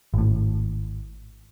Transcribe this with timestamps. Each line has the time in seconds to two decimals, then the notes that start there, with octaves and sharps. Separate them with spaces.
0.14 G#1 A2